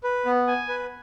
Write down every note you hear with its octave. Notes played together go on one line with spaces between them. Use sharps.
B4
B3
G#5
B4